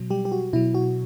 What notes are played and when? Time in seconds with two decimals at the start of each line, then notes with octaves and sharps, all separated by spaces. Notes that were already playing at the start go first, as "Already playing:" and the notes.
Already playing: B2 F#3
0.10 G3 G4
0.25 G4
0.32 F#4
0.53 B2 F#3 E4
0.74 F#4